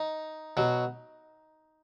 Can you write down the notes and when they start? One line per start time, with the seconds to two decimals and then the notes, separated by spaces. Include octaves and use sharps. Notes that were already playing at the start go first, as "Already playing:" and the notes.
Already playing: D#4
0.57 B2 F#3